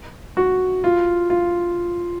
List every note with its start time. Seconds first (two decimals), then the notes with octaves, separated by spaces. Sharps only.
0.37 F#4
0.84 F4
1.30 F4